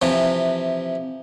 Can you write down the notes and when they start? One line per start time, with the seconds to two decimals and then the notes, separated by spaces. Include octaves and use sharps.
0.02 C3 E3 F3